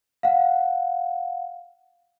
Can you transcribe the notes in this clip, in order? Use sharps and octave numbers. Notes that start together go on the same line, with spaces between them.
F5 F#5